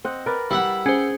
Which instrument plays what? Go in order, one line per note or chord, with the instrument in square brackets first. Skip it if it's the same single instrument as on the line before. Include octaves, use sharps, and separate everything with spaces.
[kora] C4 D#5 F#5
A#4 B4 D5
[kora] G3 [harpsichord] E4 E5 F#5
[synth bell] C#4 C5 [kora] G#4